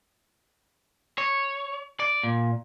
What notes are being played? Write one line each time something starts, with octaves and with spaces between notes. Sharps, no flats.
C#5
D5
A#2